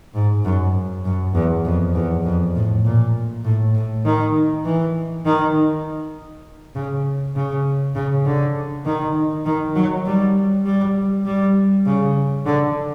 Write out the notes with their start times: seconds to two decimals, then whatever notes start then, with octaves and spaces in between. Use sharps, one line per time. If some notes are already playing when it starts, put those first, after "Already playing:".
0.15 G#2
0.45 F#2
1.05 F#2
1.35 E2
1.65 F2
1.95 E2
2.25 F2
2.55 A2
2.85 A#2
3.44 A2
3.75 A2
4.05 D#3
4.65 E3
5.25 D#3
6.75 C#3
7.35 C#3
7.95 C#3
8.25 D3
8.86 D#3
9.46 D#3
9.75 F#3
10.06 G3
10.65 G3
11.26 G3
11.86 C#3
12.46 D3